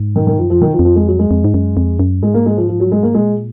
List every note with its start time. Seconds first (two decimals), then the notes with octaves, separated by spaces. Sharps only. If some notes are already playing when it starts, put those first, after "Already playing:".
Already playing: G#2
0.16 D#3
0.27 D#3
0.38 F#2 F3
0.50 F2 F3
0.61 D#3
0.73 F3
0.79 F2
0.85 F3
0.96 G#3
1.08 F#3
1.19 G#3
1.31 F2
1.44 G#2
1.54 F#2
1.77 F2
2.00 F#2
2.22 G#2 G#3
2.34 A#3
2.46 G#3
2.57 F3
2.69 F3
2.80 F#3
2.92 G#3
3.03 A#3
3.14 A#2 G#3